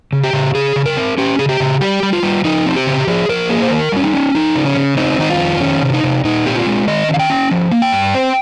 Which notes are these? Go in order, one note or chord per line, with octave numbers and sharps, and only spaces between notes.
C#3
G4
C#3
C#3 G#4
C#3
A#4
C4
C#4 G4
C#3 G#4
G4
C#3
G3 G4
G3
F4
G3
F3 D#4
C4
G4
C#3
F3 G#4
F3 A#4
A#3 G#4
C5
D#3 A#4
G3 C#4
D#4
C#4
F3 D#4
C#3
C#4
C#3
C4 D#4
D#3 D#4
F4
F2
D#3 C#4
C3
D#4
C3
A#2 D#4
C4 G4
F4
G#3
D#3 D#5
C#4
F5
G5
C#4
F3
A#3
G5
G2
C4